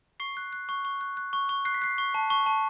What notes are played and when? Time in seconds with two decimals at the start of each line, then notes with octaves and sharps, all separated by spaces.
0.20 C#6 C7
0.37 F#6
0.53 F#6
0.69 C#6
0.85 C#6
1.01 F#6
1.17 F#6
1.33 C#6
1.49 C#6
1.65 F#6 C7
1.74 B6
1.82 F#6 C7
1.98 C#6
2.14 A5
2.30 C#6
2.46 A5